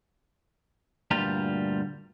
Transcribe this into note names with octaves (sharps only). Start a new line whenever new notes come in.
D2 G2 A#2 G3 F4 A#5